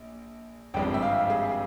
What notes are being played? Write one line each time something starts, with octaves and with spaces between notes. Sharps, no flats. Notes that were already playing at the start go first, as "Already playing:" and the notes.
Already playing: A#1
G#1 G2 F3 G#3 C4 G5
E5
F5
G#4